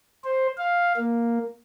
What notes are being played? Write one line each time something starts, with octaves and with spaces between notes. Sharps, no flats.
C5
F5
A#3